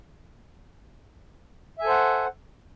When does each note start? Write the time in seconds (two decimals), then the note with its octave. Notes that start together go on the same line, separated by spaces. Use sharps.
1.79 E5
1.81 G#5
1.84 A4
1.87 C5
1.90 F#5